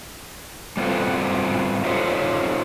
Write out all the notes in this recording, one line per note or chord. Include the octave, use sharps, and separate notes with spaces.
G3 B3 C4 F4 A4
D#4 F4 G4 A4 C5 C#5